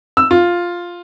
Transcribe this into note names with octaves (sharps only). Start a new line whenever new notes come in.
E6
F4